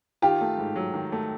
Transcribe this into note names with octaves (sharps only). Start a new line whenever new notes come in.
D#3 F4 G4
A3
G#2
F#3
D#3
A3